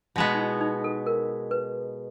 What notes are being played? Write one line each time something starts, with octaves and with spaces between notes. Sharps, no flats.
B2 G#3 B3
D#4
E4
D#4
A4
A#4
B4